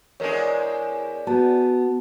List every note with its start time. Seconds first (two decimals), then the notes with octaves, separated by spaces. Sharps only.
0.20 E2 G#3 D4 A#4 C#5
1.27 B3 F#4 A5